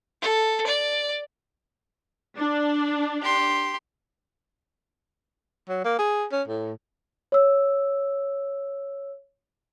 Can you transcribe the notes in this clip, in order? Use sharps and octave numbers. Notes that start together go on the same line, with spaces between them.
A4
D5
D4
G4 C6
F#3
A#3
G#4
C#4
A2
C#5 E6